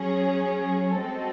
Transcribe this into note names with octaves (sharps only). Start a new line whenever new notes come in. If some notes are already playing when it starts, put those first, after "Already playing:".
Already playing: F#3 C#4 G#4
G#3 C4 F#4 A4 D#5